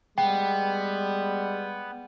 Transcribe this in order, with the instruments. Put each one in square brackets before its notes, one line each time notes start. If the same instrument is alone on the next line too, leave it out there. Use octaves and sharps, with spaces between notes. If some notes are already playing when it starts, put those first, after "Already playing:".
[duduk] G3 [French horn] G#3 [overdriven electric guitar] B3 [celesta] G5